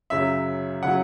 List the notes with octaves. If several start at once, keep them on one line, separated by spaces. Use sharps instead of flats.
F#2 C#3 F#3 E5
C#3 F#3 F#5